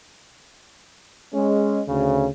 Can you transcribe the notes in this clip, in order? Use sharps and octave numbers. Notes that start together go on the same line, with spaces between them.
G#3 C#4
D2 C#3